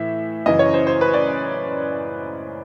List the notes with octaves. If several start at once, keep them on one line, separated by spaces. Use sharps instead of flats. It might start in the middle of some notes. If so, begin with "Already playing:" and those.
Already playing: A2 E3 E5
F#2 C#3 E3 D#5
C#5
C5
C5
B4
D5